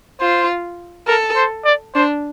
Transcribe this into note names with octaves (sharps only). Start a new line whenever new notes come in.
F4 C5
A4 A#4
C5
D5
D4 C5